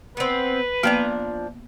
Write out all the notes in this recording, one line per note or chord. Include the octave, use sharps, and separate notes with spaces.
B3 C4 B4
F3 A#3 B3 D4 A#5